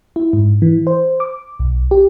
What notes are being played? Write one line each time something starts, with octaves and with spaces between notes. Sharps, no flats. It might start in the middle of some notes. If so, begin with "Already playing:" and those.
E4
G#2
E3
C5
D6
B1
G4